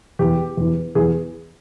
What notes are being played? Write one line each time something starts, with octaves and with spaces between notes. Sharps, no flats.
E2 E3 G4
E2 E3
E2 E3 G#4